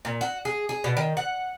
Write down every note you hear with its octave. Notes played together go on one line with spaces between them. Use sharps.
A#2
F#4
G#4
G#4
B2
D#3
F#5